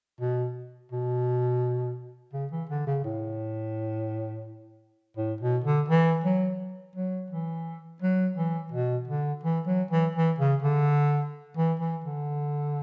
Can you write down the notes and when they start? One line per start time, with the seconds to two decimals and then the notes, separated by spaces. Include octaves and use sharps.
0.21 B2
0.92 B2
2.33 C#3
2.52 E3
2.69 D3
2.87 C#3
3.04 A2
5.17 A2
5.41 B2
5.65 D3
5.89 E3
6.24 F#3
6.96 F#3
7.31 E3
8.02 F#3
8.37 E3
8.72 B2
9.08 D3
9.44 E3
9.67 F#3
9.91 E3
10.15 E3
10.39 C#3
10.62 D3
11.57 E3
11.80 E3
12.04 D3